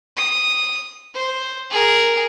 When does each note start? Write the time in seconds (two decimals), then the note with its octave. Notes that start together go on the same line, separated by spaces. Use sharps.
0.17 D#6
1.14 C5
1.71 G#4 A#4